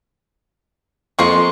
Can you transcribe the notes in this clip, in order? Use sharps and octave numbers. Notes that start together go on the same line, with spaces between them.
F2 F3 G#3 A#3 C6 C#6